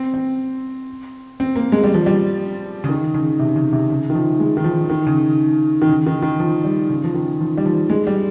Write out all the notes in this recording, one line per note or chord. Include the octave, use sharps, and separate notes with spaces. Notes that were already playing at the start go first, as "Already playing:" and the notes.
Already playing: C4
C4
C4
A#3
G#3
G3
F3
G3
C#3
D#3
C#3
C3
C#3
C3
C#3
D#3
F3
G#3
D#3
F3
D#3
C#3
D#3
C#3
D#3
D#3
F3
G3
C#3
F3
D#3
F3
G3
F3
G#3
G3